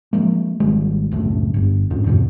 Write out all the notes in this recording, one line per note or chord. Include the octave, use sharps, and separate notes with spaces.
F3 G#3 A#3
G#1 D#3 G3 G#3
F#1 C#2 F#2 A2
G1 G2
F2 G#2
E2 G2 B2 D3